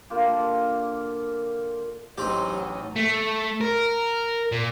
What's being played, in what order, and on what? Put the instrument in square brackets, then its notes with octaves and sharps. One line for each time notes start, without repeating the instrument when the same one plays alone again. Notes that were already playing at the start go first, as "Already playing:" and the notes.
[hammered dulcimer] D3 A#3 F4 G4
[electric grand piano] A1 [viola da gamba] F#3 D#4 [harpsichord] C4 G4
[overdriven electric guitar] A3
A#4
A#2